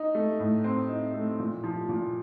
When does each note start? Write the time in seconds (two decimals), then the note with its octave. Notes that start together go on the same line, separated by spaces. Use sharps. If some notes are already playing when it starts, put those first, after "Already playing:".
Already playing: D#4
0.15 A3
0.39 A2
0.64 C4
0.89 D#4
1.14 A3
1.39 A#2
1.63 F3
1.89 A#2